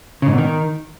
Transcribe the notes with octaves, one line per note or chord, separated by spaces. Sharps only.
C#3
G#2
B2
D#3